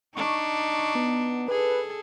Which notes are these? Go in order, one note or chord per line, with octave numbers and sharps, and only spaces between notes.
D4 D#4 C#6
B3
G#4 A4 B4